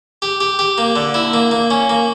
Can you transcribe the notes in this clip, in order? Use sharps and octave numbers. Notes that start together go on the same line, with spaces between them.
G4
G4
G4
A#3
D3
E4
A#3
A#3
C#4
A#3